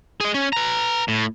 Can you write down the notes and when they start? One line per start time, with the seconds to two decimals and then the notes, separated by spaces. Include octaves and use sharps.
0.21 G#4 D#5
0.34 C#4
0.53 B4 A#5
1.08 A2